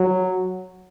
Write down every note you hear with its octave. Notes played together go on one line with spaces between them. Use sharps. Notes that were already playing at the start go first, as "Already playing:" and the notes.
Already playing: F#3